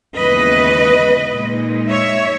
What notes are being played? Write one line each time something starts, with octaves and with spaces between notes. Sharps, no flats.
D#2 C#3 E3 G#3 B3 B4 D#5
A#2 G#3 D#4
C#5 E5